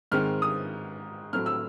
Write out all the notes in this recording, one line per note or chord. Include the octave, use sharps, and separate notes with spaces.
G#2 D#3 G#3 C4 F6
D#6
A2 F#3 A3 C4 F6
E6